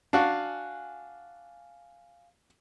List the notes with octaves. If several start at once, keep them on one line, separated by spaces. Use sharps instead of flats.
D4 F#4 F5 G#5